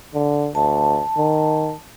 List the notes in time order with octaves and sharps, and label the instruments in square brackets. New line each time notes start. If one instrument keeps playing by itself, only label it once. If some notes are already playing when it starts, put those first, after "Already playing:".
[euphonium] D3
[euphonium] D2 [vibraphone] A5
[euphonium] D#3